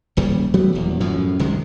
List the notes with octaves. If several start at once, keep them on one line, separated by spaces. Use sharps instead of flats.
D#1 D#2 C#3 G3
F#3 G3 A3 B3
D#1 E2
F#2 A2 F3
C2 C3 D#3 G#3